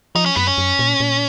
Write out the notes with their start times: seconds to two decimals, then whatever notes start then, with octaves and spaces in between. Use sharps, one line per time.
0.15 F3 D#4
0.26 C#4
0.36 F#2 B3
0.47 C#4
0.58 F#2
0.79 A#2
1.00 A#2